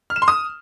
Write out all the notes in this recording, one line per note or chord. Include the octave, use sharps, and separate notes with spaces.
F6
E7
C6
D#6